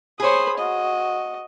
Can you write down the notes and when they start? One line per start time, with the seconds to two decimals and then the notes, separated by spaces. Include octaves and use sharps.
0.20 G#4 C5 C#5 B5 D#6
0.58 F#4 D#5